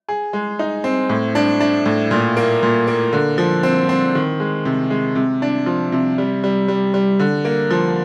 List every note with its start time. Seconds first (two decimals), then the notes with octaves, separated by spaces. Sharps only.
0.09 G#4
0.33 G#3
0.59 D#4
0.84 C4
1.09 A2
1.35 D4
1.60 D4
1.86 A2
2.11 A#2
2.37 A#3
2.63 A#2
2.87 A#3
3.13 D3
3.38 F3
3.63 C4
3.89 C4
4.15 D#3
4.40 G#3
4.65 C3
4.90 G#3
5.15 C3
5.42 D4
5.66 F3
5.92 C3
6.18 G3
6.44 G3
6.68 G3
6.94 G3
7.20 D3
7.45 A#3
7.70 F3